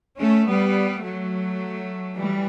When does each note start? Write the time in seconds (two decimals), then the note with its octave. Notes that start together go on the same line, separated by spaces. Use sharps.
0.18 A3 C#4
0.46 G3 B3
1.03 F#3 A3
2.16 E3 G3